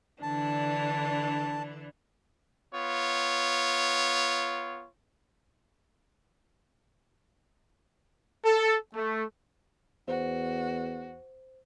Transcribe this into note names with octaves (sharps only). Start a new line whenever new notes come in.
D3 E3 D4 A5
B3 F4 C#5
A4
A3
E2 F#4 C5